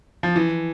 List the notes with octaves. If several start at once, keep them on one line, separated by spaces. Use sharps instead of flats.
F3
E3